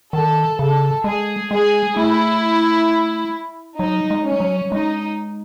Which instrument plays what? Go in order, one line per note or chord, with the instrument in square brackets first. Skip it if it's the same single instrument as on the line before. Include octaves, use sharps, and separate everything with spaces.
[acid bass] D#3 [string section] A4
[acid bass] C#3 [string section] A4
[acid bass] G#3 [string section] G#4
[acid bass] G#3 [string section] G#4
[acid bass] A3 [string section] E4
[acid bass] F#3 [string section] D#4
[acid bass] G#3
[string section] C#4
[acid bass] F#3
[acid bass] G#3 [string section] D#4